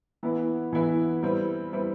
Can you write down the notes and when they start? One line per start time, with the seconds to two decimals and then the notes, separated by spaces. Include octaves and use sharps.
0.23 E3 B3 E4 B4
0.72 E3 B3 E4 B4
1.23 G3 C4 E4 B4
1.73 G3 C4 E4 B4